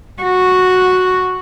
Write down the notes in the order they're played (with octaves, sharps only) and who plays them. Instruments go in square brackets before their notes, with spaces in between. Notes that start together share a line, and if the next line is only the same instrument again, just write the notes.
[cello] F#4